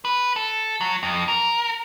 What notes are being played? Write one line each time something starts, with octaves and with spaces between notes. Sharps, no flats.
B4
A4
F#3
F2
A#4